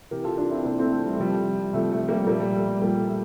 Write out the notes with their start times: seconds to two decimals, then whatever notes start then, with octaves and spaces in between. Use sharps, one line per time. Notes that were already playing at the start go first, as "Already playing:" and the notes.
0.11 C3 E3 G4 A#4
0.24 F4 A4
0.38 D4 F4
0.51 C4 E4
0.65 C3 E3 A#3 D4
0.79 A3 C4
0.92 A3
1.06 G3
1.13 A3
1.19 C3 F3 G3
1.73 C3 F3 A3
1.92 A3
2.09 G3 A#3
2.27 A#2 F3 G3 A#3
2.40 G3
2.55 A3
2.67 G3
2.81 A#2 F3 G3 A#3
3.08 A3